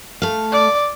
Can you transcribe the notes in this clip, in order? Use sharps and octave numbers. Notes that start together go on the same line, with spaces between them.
A3 F5
D5